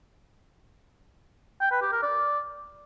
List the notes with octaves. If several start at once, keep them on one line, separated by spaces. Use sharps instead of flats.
G5
B4
G4
A#4
D5